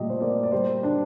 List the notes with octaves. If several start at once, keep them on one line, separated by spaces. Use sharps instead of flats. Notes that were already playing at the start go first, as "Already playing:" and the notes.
Already playing: A#2 G3 A3 D#5
C5
A#3 D5
D5
G3 C5
D4